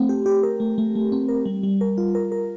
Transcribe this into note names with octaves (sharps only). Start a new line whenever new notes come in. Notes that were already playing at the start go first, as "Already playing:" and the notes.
Already playing: A3 C4
G4
G4
A#4
A3
A3
A3
C4
A#4
G3
G3
A#4
F4
A#4
A#4